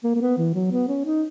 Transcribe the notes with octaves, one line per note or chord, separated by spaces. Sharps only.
A#3
A#3
B3
E3
F#3
B3
C#4
D#4